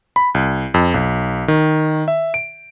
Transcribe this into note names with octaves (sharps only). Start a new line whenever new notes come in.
B5
C2
F2
B1
D#3
E5
D7